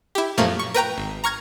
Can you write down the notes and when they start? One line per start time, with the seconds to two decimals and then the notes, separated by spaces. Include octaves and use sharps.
0.15 E4 G4
0.38 F#2 A#2 F3 A3 A#3
0.59 C#6
0.74 A#4 B4 G5 A#5
0.98 G#1
1.24 A#5 C#6 F6 G#6 A#6